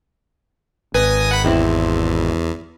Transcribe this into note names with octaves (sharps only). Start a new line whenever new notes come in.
G#1 B4 G#5 D#6 A#6
F#5 B5 B6
E2 C4 E4 G4